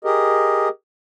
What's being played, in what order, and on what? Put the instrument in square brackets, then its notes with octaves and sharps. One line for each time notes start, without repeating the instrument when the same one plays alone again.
[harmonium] G4 G#4 A#4 D#5